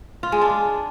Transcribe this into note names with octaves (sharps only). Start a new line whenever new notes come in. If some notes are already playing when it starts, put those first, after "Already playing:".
F4
G#3
D4